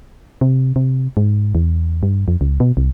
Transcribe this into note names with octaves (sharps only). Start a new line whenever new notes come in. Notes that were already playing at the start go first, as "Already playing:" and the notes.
C3
C3
G#2
E2
G2
F2
C#2
B2
C2